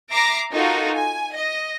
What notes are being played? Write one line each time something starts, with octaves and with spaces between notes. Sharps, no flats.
E5 A#5 D6 A#6 C7 D7
D#4 F4 F#4 A4 A#4
G#5
D#5